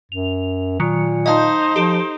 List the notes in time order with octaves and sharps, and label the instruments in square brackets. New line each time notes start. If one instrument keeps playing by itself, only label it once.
[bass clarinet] F#2 [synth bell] F7
[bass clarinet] A#2 [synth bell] D#3 F#3 C#7
[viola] D#4 C5 [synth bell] D#5 F5 A5
[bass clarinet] F3 [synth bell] G4 A4 D7